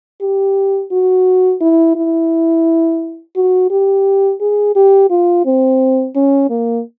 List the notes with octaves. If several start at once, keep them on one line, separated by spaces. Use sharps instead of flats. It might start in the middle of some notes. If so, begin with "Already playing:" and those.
G4
F#4
E4
E4
F#4
G4
G#4
G4
F4
C4
C#4
A#3